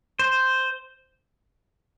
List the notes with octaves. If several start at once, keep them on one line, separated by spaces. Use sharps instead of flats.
C5